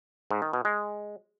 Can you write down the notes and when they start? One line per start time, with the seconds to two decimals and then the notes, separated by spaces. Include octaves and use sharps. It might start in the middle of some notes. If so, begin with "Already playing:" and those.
0.31 G#2
0.42 D#3
0.53 B2
0.65 G#3